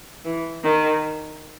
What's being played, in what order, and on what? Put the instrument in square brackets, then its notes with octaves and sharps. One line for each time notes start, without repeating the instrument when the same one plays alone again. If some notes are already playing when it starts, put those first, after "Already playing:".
[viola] E3
D#3